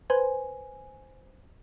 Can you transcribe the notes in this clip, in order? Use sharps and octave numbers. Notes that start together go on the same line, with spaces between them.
B4 C5 G#5